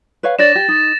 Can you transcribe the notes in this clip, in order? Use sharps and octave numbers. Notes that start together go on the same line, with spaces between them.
B4 C#5 F5
D4 C#5 D5 A6 A#6 E7
G4
D#4